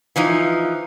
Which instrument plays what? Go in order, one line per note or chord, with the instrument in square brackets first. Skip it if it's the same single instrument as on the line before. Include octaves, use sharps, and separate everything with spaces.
[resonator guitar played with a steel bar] E3 F3 D#4